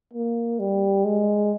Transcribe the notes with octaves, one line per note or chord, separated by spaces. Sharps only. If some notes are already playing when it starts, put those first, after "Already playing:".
A#3
G3
G#3